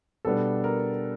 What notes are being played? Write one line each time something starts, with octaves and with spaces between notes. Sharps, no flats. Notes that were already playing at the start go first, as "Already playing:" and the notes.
B2 G3 B3 D4 A4
A#4